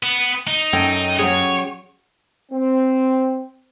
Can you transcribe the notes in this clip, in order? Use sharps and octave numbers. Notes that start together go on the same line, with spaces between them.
B3
D#4
F#2 C#4 A4 G5
F#3 C#4 G#4 C#5
C4